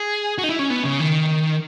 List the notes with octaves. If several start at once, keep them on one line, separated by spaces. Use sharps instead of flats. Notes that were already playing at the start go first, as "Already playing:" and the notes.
Already playing: G#4
F#4
D#4
E4
C#4
B3
C#3
D#3